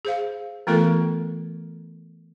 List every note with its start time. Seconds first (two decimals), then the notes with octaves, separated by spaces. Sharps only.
0.05 G#4 C5 F5
0.67 E3 A3 B3 F4 A4 A#4